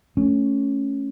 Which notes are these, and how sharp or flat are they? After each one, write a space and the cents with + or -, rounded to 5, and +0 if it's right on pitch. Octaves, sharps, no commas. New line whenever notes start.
A3 +0 C#4 +0